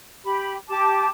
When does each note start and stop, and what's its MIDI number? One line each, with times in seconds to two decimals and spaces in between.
0.24 0.56 67
0.24 0.56 83
0.69 1.09 67
0.69 1.09 81
0.69 1.09 86